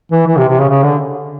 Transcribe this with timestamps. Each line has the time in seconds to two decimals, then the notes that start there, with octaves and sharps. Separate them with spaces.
0.12 E3
0.27 E3
0.37 C3
0.48 C3
0.59 C#3
0.69 C#3
0.83 D3